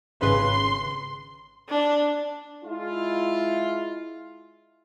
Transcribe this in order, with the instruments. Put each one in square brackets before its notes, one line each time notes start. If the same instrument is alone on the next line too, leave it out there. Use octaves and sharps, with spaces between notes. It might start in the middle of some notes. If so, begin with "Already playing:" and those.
[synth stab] G#1 C#3 B4 [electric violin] C6
[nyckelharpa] D4
[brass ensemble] G#3 E4 F4